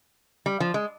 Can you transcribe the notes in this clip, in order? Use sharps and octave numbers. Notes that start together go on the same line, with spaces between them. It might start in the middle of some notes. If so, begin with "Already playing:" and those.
G3
F3
G#3